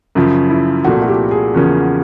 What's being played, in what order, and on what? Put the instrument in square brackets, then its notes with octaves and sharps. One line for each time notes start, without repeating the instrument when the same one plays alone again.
[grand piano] F#2 C#3 F3
[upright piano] E4
[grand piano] C2 A#2 F3 A3 [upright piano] F#4
[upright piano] F#4
G4
G#4
[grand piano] E2 C#3 F3 A#3 C#4